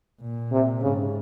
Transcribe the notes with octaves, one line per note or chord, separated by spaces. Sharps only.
A#2
C3
G#2 C#3